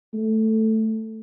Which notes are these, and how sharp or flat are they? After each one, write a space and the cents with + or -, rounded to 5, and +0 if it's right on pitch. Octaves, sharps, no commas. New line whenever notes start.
A3 +0